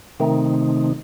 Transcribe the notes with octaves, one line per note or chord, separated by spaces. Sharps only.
C3 D#3 A3 C4 D#4